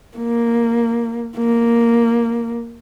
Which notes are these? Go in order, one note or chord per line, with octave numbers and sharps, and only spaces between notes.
A#3
A#3